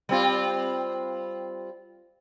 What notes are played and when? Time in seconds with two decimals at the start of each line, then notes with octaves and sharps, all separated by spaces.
0.09 G3 C4 F4